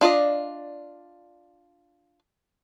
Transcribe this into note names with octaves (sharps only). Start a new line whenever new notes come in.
D4 F4 D5 D#5